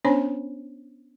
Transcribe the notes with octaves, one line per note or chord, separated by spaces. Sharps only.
B3 C#4 D4 C5 C#5 G#5